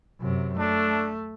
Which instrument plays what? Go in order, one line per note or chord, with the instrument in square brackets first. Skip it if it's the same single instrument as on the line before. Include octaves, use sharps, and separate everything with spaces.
[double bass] F#2 C3
[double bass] A3 [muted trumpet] D4